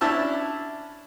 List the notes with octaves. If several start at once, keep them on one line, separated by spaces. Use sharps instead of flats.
C#4 D4 E4 E5 A5